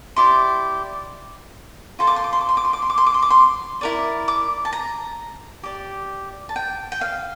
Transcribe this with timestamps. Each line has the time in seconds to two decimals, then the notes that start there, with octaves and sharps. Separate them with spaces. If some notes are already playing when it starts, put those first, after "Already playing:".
0.16 E4 G4 D5 C6
1.99 F4 A4 C5 C6
2.07 D6
2.16 C6
2.24 D6
2.33 C6
2.41 D6
2.49 C6
2.57 D6
2.65 C6
2.73 D6
2.82 C6
2.90 D6
2.98 C6
3.06 D6
3.14 C6
3.22 D6
3.30 C6
3.81 E4 A#4 D5
4.28 D6
4.65 A5
4.73 A#5
5.63 G4 D5
6.49 A5
6.56 G5
6.92 G5
7.01 F5